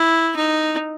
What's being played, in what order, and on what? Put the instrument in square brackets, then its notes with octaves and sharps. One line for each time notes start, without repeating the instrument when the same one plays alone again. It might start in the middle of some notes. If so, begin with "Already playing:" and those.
Already playing: [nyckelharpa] E4
D#4